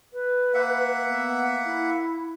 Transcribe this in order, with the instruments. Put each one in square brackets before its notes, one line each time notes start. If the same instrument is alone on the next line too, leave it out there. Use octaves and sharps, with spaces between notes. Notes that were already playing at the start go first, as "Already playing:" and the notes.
[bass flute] B4
[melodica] A#3 E5 F#5
[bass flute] B3
E4